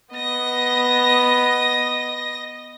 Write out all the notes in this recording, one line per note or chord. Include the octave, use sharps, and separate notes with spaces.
B3 D#5 A#6